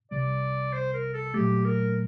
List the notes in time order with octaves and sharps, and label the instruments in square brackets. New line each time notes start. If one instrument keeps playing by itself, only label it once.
[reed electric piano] C2 C3 G3 [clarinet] D5
[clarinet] C5
A#4
A4
[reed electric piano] A#2 F#3 A3 [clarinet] G4
[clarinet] A#4